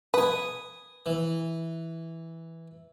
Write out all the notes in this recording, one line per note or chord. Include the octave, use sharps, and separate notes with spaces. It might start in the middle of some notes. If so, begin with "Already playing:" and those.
B4 G#5 D#6
E3